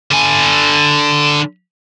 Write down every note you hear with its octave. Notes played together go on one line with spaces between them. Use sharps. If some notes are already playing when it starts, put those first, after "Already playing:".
D3 G#5